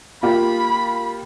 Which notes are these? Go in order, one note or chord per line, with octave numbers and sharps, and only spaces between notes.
A#3 F4 G4 B5